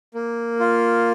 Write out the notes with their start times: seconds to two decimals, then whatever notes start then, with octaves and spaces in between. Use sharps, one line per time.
0.15 A#3
0.60 F4